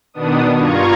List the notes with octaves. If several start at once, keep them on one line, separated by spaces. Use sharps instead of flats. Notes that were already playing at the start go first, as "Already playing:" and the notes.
B2 D#3 B3 D4 D#6
G2 F4 A#5 C#6 G#6